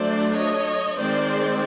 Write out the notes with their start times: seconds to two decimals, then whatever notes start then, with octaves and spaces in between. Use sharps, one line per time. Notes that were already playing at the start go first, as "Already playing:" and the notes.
Already playing: F#3 A3 D4 C5 D5
0.35 C#5 D#5
0.97 D#3 G#3 C4 C5 D5